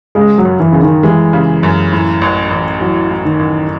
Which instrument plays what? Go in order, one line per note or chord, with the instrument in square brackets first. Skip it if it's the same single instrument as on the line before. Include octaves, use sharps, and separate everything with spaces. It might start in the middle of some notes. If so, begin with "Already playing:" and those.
[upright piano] C#3 [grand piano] G#3
[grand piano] F#3
[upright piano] F#2
[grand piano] E3
[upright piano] F#2 [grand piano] C#3
[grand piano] D#3
[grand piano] E3 [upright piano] G#3
[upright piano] C#3
F#2
A2
A1
A1
[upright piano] E3 [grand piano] F#3
[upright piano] A2
[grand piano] D#3
[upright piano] A1